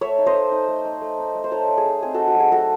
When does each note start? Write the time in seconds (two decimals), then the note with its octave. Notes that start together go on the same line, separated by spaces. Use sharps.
0.01 A3 C#5 E5
0.18 D#4
0.26 C5 D#5
0.35 A3
0.52 D#4
0.68 A3
0.85 D#4
1.02 A3
1.19 D#4
1.35 A3
1.44 C5
1.52 D#4 A4 C#5
1.69 A3
1.78 G#4
1.85 D#4
2.02 C4 G#4
2.14 D#4 F#4 A4
2.27 F#4
2.35 F#3 G#4
2.52 A3 F#4 A4